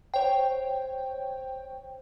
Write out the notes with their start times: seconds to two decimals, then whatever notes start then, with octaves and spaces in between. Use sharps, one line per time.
0.14 C5 C#5 G5